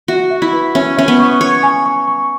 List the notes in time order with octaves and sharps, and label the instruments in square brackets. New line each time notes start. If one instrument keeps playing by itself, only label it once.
[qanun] F#4 [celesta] E5
[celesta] E5
[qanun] E4
[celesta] B4
[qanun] C#4 [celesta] E5
[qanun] C#4 [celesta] E5
[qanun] B3
[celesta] C#6
[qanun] C#5 [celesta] C#6
[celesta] G#5
C#6
C#6